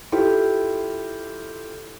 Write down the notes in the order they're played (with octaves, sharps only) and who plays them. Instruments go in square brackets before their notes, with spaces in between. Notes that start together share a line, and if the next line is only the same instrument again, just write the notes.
[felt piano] E4 F4 G4 A4